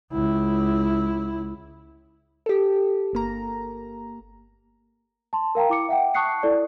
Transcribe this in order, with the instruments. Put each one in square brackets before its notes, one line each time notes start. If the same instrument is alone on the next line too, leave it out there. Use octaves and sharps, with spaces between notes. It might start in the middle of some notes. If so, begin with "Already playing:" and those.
[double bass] C#2 E4
[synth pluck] G4 A4
G1 A#3 A#5
[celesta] A5 C6
A#4 F5 G5 A#5
E4 D6 C#7
E5 F#5 G5
A5 C#6 D#6 F#6 C7 C#7
E4 A4 D5